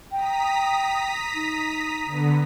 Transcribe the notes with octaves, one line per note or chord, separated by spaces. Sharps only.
G5 A#5 D#6 B6
D#4
D3 B3